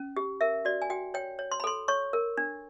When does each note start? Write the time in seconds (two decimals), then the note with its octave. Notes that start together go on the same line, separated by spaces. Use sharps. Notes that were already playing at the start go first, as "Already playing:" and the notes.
Already playing: C#4
0.16 G4
0.41 A#4 E5
0.65 F#4 D5
0.82 G#5
0.90 F#4 G5
1.14 C#5 G5
1.39 C#5
1.51 C6
1.60 B5
1.64 A4 C6
1.88 C#5 C#6
2.13 A#4
2.37 D4